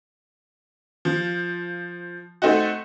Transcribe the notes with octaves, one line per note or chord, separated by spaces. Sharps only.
F3
A3 C4 D#4 F#4